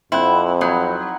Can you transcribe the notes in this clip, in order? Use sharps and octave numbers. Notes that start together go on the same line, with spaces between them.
F2 C4 E4 F#5 B5
F#3 D#4 E4 F#5